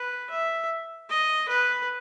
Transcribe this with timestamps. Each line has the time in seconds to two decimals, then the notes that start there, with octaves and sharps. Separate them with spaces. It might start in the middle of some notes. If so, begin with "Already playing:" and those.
Already playing: B4
0.30 E5
1.09 D#5
1.48 B4